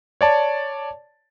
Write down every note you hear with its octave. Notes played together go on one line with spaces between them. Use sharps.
C#5 D5 A5